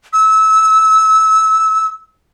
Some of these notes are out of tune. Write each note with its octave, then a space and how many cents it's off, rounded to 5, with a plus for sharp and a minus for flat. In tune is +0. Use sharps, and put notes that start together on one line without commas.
E6 -25